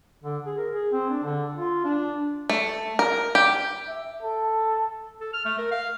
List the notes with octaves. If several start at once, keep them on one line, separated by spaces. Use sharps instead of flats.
D3
G#4
A#4
G#4
C4
D4
D3
F4
D4
A3
A#4
G4
E5
A4
A4
F6
A3
A#4
F5